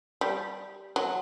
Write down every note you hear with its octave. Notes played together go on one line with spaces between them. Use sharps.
G3
F#3